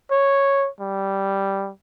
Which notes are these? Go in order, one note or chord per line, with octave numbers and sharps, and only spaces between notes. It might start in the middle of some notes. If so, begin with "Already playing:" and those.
C#5
G3